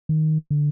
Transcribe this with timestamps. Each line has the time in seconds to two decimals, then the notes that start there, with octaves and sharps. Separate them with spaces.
0.09 D#3
0.51 D3